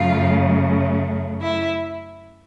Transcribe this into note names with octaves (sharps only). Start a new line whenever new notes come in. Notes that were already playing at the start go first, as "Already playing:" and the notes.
Already playing: F#2 C#3 F#3 A3 F4 F5
E4 E5